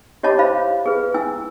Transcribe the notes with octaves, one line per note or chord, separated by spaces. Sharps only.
G4 C#5 D#5 A5 B5 D6
E4 C5 F5 B5
G#4 B4
E4 G#5 E6